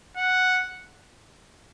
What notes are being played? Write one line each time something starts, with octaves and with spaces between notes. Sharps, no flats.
F#5